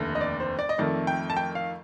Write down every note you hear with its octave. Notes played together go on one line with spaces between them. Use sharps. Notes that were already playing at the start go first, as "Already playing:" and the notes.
Already playing: F1 D#2 D3 A3
D#5
D5
C5
D5
D#5
F2 D#3 A3 D5
G5
A5
G5
F5